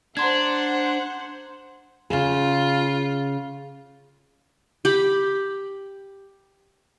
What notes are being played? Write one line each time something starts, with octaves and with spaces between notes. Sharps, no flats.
D4 C5 F#5 A#5 C6 G#6
C#3 F4 G#4
G4 B5